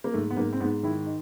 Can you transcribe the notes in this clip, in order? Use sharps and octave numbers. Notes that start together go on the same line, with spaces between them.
A#3
G#2 A3
B3
G#2 A#3
C4
G#2 B3
D#3 E4
D#4